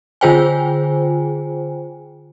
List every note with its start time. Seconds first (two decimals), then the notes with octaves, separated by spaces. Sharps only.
0.21 D3 F4 G#4 C5 G5 G#5